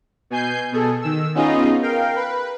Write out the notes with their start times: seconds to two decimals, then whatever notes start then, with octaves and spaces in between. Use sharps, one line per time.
0.30 B2 G#5 G6 C7
0.72 B2 G#4 A4
1.02 D#3 E6
1.35 B3 C#4 D#4 F4 G#4 D#5
1.82 A#4 F5 G5
2.16 B4